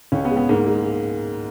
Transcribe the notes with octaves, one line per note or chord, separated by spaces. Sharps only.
C#2 C#4
B3
G#3
B3
G#2 A#3
G#3